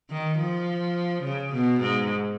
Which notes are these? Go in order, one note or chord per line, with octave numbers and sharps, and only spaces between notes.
D#3
F3
C#3
B2
G#2